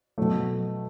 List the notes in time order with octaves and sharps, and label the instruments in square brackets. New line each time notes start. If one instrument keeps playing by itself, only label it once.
[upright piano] B2 F#3 A3